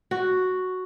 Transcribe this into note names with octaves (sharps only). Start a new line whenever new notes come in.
F#4